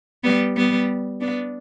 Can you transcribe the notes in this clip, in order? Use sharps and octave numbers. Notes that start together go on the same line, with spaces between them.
G3 B3
G3 B3
B3 D4